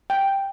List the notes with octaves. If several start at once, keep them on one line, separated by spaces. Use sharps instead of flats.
G5